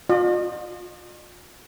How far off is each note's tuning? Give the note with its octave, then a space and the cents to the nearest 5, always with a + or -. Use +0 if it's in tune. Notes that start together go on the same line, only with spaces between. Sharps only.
F4 +35 D#5 -45